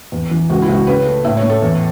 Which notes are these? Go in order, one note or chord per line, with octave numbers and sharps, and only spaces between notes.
E2
E3
C#2 F#4
E4
C#2
F#4
C#3 B4
A3
A2 E5
C#5
A2
A4
E2